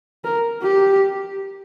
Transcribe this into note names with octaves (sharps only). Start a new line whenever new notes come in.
A#4
G4